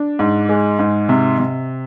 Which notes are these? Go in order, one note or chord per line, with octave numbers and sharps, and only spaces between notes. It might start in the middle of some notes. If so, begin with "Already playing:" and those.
Already playing: D4
G#2
G#3
G#2
C3
C3